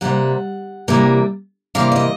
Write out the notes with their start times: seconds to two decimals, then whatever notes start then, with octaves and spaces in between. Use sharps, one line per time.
0.01 C3 E3 G3 A#3 F#5
0.88 C3 E3 G3 A#3
1.75 C3 E3 G3 A#3 F5
1.92 D5
1.96 D#5